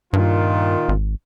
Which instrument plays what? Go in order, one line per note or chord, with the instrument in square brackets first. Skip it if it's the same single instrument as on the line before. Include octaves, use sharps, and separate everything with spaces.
[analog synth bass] G2 [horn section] A#2 D#3 F4
[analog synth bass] G#1